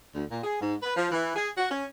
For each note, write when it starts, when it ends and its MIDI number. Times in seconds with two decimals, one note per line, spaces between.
0.15 0.25 38
0.31 0.40 46
0.44 0.58 68
0.60 0.75 44
0.82 0.95 71
0.97 1.09 53
1.12 1.31 52
1.36 1.50 68
1.58 1.71 66
1.71 1.86 61